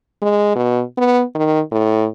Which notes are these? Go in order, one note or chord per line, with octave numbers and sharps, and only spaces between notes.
G#3
B2
B3
D#3
A2